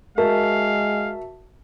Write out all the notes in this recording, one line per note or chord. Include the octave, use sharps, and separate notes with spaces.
G#3 F#4 A#4 E5 F5 A5